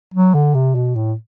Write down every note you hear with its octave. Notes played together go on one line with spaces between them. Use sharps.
F#3
D3
C3
B2
A2